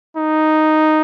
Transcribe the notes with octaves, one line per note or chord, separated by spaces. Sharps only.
D#4